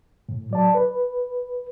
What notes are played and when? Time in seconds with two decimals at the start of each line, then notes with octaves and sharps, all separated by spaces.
0.29 A2
0.51 F#3 D5 A5
0.75 B4